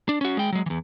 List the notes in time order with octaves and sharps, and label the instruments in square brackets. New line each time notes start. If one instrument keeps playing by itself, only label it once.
[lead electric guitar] D4
C#4 F#4
G#3 G5
F#3 G#3
E2 E3